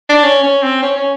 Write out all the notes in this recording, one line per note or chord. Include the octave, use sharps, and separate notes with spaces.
D4
C#4
C#4
C4
C#4
C#4